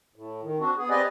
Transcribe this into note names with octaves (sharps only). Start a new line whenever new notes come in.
A2
D#3
C4 D4 F#4
B3 G#4
C4 G4 B4 D5 D#5 G#5